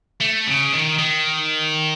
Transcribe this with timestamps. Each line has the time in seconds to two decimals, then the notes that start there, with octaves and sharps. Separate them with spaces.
0.21 A3
0.47 C#3
0.73 D#3
0.99 D#3